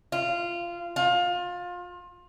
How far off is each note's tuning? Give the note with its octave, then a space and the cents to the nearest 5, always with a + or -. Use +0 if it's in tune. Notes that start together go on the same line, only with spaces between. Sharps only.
F4 -15
F4 +25